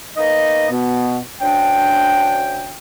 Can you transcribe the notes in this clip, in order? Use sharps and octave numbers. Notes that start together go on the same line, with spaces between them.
A#3 B3 D#4 D#5
B2 B3
D2 C#4 D4 G5